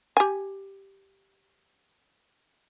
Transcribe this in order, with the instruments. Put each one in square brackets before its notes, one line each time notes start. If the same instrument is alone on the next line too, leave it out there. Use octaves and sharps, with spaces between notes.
[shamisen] G4 G#5